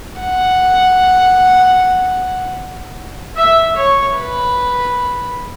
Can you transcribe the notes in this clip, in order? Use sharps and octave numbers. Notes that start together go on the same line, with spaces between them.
F#5
E5
C#5
B4